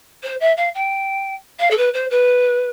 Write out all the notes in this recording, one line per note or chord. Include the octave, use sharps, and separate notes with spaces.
C5
E5
F5
G5
F5
A4
B4
C5
B4